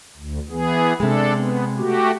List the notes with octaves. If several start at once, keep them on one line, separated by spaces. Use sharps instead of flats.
D2
E3 B3 G#4
C3 G#3 D4 A4
B3
A3 F#4 G4